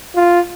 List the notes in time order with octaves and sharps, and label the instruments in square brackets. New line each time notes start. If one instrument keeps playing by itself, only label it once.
[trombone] F4